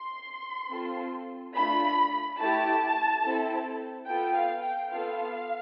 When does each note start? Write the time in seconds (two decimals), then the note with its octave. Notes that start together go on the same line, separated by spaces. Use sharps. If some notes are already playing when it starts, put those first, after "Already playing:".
Already playing: C6
0.70 C4 F4 A4
1.54 A3 D4 F4 B5
2.38 A3 E4 G4 A5
3.22 C4 E4 A4
4.06 B3 F4 A4 G5
4.34 F5
4.62 G5
4.90 B3 F4 A4 F5